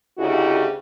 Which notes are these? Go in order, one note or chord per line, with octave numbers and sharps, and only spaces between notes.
D2 C#3 D#4 E4 F#4 G4